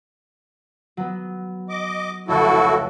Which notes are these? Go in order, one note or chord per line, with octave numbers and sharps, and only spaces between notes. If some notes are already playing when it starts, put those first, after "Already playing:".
F#3 B3
D#5 D6
F1 C#2 E4 F#4 A4